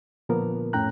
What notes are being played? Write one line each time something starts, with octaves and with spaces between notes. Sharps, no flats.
A#2 D3 F3 A#3 B3 A#4
F2 A2 C#4 G5 A#5 F#6